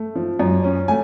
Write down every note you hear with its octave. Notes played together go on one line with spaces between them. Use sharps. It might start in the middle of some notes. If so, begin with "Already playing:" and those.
Already playing: A3
F3
F#2
C#4
A3 G#5